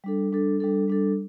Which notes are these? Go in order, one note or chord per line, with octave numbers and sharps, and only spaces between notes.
G3 D4 A4
G3 D4 A4
G3 D4 A4
G3 D4 A4